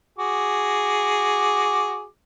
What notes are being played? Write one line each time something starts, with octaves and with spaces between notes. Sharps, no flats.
F#4 G#4 D6